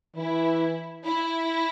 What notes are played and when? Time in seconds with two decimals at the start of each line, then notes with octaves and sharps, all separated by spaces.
0.16 E3 E4
1.05 E4